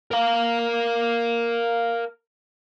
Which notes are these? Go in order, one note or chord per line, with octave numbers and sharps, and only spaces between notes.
A#4 F5